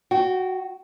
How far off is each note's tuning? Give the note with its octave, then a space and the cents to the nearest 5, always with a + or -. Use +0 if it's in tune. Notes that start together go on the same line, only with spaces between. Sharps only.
F#4 +0 G5 -30